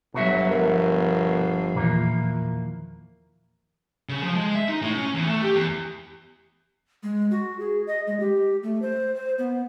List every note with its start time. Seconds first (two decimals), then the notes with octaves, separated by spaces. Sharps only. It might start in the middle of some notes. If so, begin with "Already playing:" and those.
0.14 G1 B2 F#3 F#4 E5
0.51 F3 A#4
1.75 E2 A#2 D#3 E3 A#3
4.09 C#3
4.23 F3
4.36 G#3
4.55 E5
4.69 D#4
4.83 A2
4.95 C#4
5.14 E2
5.27 A3
5.42 G4
5.55 E2
7.03 G#3
7.31 F#4
7.60 G#4
7.87 D#5
8.07 G#3
8.20 G4
8.63 A3
8.82 C5
9.15 C5
9.38 B3